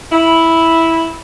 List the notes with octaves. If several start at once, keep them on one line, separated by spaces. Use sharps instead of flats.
E4